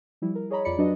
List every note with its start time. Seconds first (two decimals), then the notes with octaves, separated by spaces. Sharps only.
0.22 F3 G3 E4
0.35 A#4
0.50 G#4 C#5 D#5 A#5 B5
0.65 F2 F4 D5 B5 C#7
0.78 F#3 D4 F#4 B4 D5 D#5